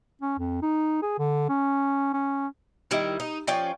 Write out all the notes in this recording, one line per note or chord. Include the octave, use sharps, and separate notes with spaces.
C#4
F2
D#4
G#4
D3
C#4
C#4
D#3 G3 E4 E5
D#4
F3 C#4 D5 G5